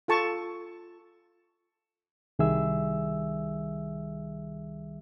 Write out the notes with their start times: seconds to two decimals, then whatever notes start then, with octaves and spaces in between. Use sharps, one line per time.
0.08 F4 A4 A5 C#6
2.39 C2 D#3 G3 G#4 E5 E6